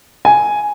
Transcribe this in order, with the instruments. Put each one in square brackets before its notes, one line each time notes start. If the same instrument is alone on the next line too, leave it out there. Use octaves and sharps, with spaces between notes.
[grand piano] G#5